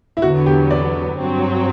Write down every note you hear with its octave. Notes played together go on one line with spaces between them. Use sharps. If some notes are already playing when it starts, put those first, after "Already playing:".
E4
E2 D3 F#3 B3 F#4
G4
D5
G2 F#3 C4